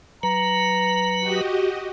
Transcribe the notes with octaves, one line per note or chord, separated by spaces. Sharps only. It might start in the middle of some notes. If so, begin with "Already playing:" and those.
F#3 B4 A#5
F#4 G4 D#5